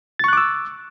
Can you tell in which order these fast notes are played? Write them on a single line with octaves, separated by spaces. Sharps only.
A6 C#6 F#6 D6 E6